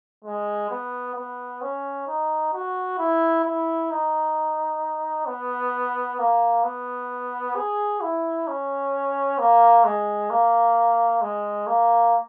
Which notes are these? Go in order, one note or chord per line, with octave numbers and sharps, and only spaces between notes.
G#3
B3
B3
C#4
D#4
F#4
E4
E4
D#4
B3
A#3
B3
G#4
E4
C#4
A#3
G#3
A#3
G#3
A#3